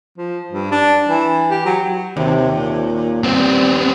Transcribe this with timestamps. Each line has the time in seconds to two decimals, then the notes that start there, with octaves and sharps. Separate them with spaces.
0.18 F3
0.51 G2
0.71 D4
1.09 E3
1.50 G4
1.66 F#3
2.17 D#2 C3
2.54 A#2
3.23 G3 B3 C4